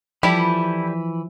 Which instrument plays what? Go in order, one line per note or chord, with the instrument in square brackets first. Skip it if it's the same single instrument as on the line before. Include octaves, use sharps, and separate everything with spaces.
[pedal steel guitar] E3 B5 [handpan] F3 [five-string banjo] G3 G4 A4 [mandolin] E4